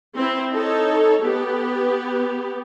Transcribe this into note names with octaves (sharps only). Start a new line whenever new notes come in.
C4 E4
D#4 A4 C#5
B3 G4